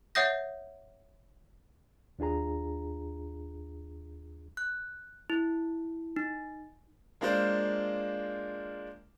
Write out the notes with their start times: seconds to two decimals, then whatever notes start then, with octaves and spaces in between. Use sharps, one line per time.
0.15 C#5 E5 F#5 D#6 G6 A#6
2.19 D#2 D4 F4 G#4 A#5
4.57 F#6
5.30 E4
6.16 D#4
7.21 G#3 A#3 D4 F4 C5